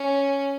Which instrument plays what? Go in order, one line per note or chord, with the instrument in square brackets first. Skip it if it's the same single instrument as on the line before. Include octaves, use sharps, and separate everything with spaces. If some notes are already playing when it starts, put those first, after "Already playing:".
Already playing: [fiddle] C#4